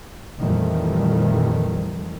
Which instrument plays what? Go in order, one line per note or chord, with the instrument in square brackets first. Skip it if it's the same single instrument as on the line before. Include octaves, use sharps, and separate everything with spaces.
[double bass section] F2 A#2 D#3 E3 G3 A3